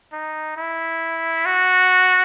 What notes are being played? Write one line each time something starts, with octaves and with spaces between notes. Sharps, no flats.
D#4
E4
F#4